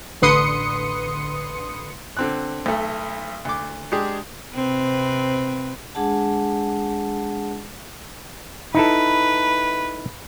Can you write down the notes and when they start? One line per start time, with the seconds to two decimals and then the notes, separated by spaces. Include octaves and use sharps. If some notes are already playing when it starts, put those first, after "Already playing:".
0.22 A1 D3 B4 C6 D#6 C#7
2.17 D3 C4 F#6
2.66 B1 A3
3.45 D2 D6
3.92 G#3 D4 G4 G#4
4.54 C3 C4 B4
5.95 G#3 D4 G#4 F#5 A5
8.75 D#4 E4 A4 B4